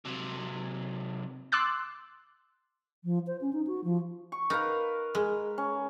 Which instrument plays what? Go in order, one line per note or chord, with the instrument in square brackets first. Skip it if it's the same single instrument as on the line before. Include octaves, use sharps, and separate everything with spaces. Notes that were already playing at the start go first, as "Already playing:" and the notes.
[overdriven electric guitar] C3 F#3
[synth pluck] C6 D6 E6 F#6 A6
[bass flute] F3
C5
C#4
D#4
F#4
F3
[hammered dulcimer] C#6
[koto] D#4 [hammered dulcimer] A#4 B4 F5
[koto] G#3
[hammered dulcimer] C#4